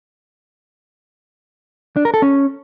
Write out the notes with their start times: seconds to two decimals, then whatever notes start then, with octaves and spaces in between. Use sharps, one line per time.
1.96 D4
2.05 A#4
2.14 A4
2.22 C#4